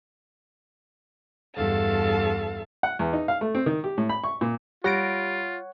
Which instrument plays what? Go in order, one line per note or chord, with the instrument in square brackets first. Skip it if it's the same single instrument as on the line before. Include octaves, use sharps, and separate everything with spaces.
[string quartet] E2 G2 A4 F5 A5
[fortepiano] F#5
E2
D#4
F5
A3
C4
D#3
G4
A2
B5
C#6
A#2
[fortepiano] G3 [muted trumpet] F4 [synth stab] G4 A#6 D7 [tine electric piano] C#5 F#5